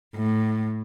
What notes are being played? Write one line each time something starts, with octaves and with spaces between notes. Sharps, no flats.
A2